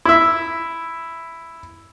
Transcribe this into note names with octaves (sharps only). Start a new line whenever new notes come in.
E4 E5